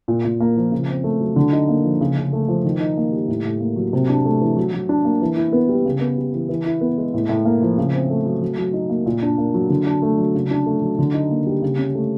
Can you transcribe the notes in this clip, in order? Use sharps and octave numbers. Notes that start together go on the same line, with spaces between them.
A#2
A#2
A#3
F3
C#3
C4
A3
F#3
D3
D#4
A#3
F3
C#3
C#3
A3
F3
D#3
D#4
A#3
G3
A2
A2
A#3
F#3
C3
D4
A3
E3
F#3
F#3
D4
A#3
E3
E4
B3
G3
C#3
B3
G3
E3
E3
E4
B3
G#3
A2
A2
A#3
F3
C#3
C4
A3
F#3
F#3
F#3
D#4
A#3
A#2
D4
A#3
F#3
D3
D4
A3
F#3
C#3
D4
A3
F#3
D3
D#4
A#3
G3
C#3
C#4
A3